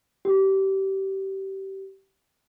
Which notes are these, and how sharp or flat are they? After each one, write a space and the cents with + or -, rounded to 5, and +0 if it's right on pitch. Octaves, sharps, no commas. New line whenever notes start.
G4 -25